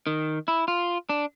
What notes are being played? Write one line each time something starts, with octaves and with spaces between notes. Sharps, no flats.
D#3
E4
F4
D4